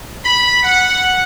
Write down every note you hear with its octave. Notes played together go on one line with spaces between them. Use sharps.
B5
F#5